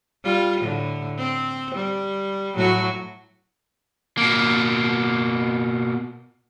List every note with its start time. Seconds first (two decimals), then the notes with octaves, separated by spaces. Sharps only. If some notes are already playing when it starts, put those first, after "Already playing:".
0.24 G3 F4
0.61 A2 D3
1.18 C4
1.75 G3
2.56 A2 F#3 F#4
4.17 B2 A#3